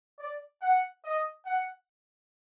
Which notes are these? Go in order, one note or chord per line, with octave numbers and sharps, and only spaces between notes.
D5
F#5
D#5
F#5